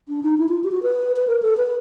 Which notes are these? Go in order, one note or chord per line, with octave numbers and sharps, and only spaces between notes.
D4
D#4
E4
F4
G4
F#4
B4
B4
A#4
A4
B4